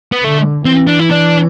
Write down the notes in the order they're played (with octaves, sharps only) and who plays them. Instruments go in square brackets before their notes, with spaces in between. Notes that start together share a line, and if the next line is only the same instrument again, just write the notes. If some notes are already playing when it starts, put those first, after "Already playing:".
[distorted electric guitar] B3
[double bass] D3 [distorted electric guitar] A3
[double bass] E3 [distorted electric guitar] C4
[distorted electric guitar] D4
E4
D4